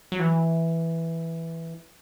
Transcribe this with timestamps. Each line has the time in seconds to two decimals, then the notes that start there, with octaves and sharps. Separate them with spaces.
0.12 F#3
0.19 E3